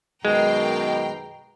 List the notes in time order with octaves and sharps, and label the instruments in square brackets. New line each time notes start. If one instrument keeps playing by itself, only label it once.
[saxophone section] F#2 B2 D#3 [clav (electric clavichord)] G#3 [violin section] G5 A#5 C7